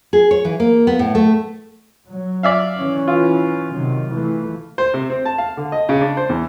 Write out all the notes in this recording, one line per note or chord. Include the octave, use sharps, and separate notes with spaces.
G#4
C#5
E3
A#3
B3
A2
A3
F#3
D5 E5 F5
E3 C#4
F4
C3 D#3 F#3
E3 A3
C5
C3
C4
A5
F5
D3
D#5
C#3
D4
C5
E2